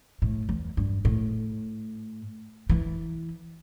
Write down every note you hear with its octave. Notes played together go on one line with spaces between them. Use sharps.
A2
E2
G2
A2
E3